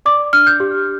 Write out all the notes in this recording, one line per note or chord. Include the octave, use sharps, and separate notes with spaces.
D5 D6
D4 F6
G6
G4